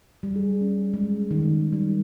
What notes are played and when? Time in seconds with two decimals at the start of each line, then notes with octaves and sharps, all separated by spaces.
0.23 G3
0.36 G#4
0.61 C#4
0.94 G#3
1.31 D#3
1.72 G3